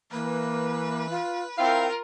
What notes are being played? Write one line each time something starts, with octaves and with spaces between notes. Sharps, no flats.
E3 A#3 B4
F4
C4 E4 F4 A#4 F5 G5